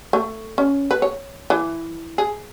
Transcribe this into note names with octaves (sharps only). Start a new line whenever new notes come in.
A3
C#4
B4
C#5
E3
G#4